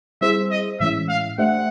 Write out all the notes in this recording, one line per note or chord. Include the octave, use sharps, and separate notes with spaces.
G3 C4 E4 G#4 C5 E5
D#5
A2 E3 G#3 C#4 E4 E5
F5
A3 D4 G4 C5 E5 F#5